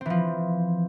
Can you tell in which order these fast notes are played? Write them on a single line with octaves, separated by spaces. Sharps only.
C4 E3 F3